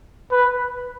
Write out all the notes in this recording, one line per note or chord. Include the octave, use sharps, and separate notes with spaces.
B4